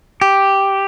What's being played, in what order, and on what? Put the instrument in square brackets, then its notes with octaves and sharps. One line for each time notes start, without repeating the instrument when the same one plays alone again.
[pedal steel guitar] G4